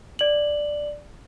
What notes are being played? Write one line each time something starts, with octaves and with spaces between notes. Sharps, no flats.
D5 F#7